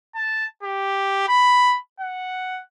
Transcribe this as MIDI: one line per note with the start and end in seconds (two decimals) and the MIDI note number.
0.15 0.45 81
0.63 1.26 67
1.28 1.77 83
2.00 2.61 78